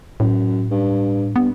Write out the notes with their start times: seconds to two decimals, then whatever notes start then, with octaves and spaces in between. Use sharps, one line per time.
0.20 F#2 A2
0.71 G2
1.36 G2 B3